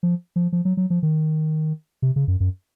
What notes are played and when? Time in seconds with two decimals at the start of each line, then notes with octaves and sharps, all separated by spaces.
0.03 F3
0.36 F3
0.53 F3
0.65 F#3
0.77 F#3
0.90 F3
1.03 D#3
2.02 C3
2.16 C#3
2.28 F#2
2.40 F#2